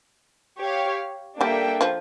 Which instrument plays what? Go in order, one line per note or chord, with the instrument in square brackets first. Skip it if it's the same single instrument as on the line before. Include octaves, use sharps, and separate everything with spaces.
[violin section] G4 C#5 F5
[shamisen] G3 G4 [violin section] A#3 D4 A4 E5 G5
[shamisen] F3 F4